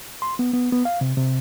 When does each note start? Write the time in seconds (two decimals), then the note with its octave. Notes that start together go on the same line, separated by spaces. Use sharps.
0.22 C6
0.39 B3
0.53 B3
0.72 B3
0.85 F5
1.01 C3
1.17 C3